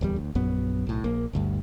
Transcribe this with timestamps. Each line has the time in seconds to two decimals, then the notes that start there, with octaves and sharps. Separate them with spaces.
0.01 D1 E2 G3
0.16 D2
0.35 A#1 F#2 F#3 B3
0.87 B1 A2
1.04 A#1 A#3
1.33 G1 D2 G2